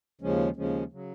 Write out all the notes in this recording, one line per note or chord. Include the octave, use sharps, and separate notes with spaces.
D#2 C#3 F3 G#3 C#4
D#2 C#3 F3 G#3 C#4
C#3 F#3